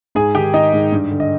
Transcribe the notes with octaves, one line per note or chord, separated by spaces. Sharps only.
G#2 G#4 G#5
D#3 G4 G5
D#3 D#4 D#5
G#2
G2
D3
D#5